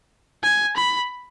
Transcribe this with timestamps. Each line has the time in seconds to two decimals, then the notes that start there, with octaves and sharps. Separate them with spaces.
0.43 G#5
0.76 B5